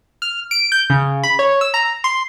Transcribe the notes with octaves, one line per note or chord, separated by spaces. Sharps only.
F6
D7
G6
C#3
B5
C#5
E6
A#5
C6